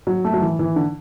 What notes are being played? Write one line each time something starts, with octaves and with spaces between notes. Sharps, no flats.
F#3
A3
F#3
E3
E3
D3